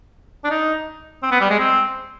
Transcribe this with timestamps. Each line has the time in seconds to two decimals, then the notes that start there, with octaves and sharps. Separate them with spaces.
0.44 D4
0.50 D#4
1.23 C4
1.32 B3
1.41 G3
1.50 G#3
1.59 C4